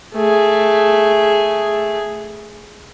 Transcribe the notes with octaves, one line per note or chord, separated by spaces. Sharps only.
A3 G#4